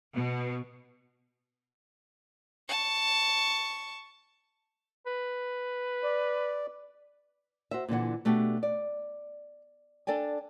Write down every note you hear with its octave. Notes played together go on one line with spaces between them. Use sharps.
B2
A5 C#6
B4
D5
F#4 C5 E5
A#2 D3 E3 F#5
B2 A3 D4 F#4 G4
D5
D4 A4 D5 G5 G#5